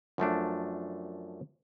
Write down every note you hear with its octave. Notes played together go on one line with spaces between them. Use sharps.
F#2 F3 A3 D4